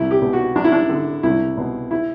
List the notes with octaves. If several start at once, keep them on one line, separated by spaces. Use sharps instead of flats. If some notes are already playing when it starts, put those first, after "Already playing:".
Already playing: C2 E4
G4
B2
F#4
F#2 D4
E4
D4
D3
C2 E4
B2
E4